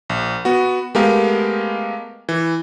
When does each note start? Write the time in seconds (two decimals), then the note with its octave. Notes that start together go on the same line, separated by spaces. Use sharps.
0.10 A#1
0.45 B3 F#4
0.95 G#3 A3 B3 G4 A#4 F5
2.29 E3